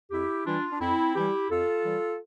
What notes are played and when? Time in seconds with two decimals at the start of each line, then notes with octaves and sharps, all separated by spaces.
0.11 F2 E4 G4
0.46 E3 G3 D4 F4
0.71 D4
0.80 F2 C4 E4
1.15 E3 G3 E4 G4
1.50 F2 F4 A4
1.85 E3 G3